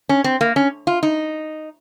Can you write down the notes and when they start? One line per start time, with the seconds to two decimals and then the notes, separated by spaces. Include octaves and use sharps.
0.09 C#4
0.24 C4
0.41 A#3
0.56 C#4
0.87 F4
1.03 D#4